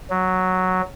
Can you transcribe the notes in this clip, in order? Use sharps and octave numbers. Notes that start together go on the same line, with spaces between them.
F#3